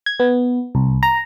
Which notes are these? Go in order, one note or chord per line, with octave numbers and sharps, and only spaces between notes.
G#6
B3
C2
A#5